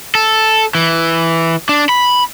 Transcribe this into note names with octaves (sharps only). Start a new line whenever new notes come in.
A4
E3
D4
B5